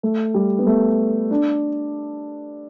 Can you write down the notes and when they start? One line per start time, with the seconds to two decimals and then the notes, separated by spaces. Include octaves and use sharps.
0.03 A3
0.34 G3
0.59 B3
0.67 A3
1.31 D4